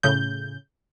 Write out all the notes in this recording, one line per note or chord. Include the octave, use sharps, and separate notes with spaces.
A2 C#3 G6